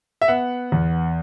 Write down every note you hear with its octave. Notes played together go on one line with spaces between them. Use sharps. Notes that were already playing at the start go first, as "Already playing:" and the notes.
E5
B3 F#5
E2